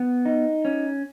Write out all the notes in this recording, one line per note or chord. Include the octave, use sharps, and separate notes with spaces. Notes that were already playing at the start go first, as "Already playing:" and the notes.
Already playing: B3
D#4
C#4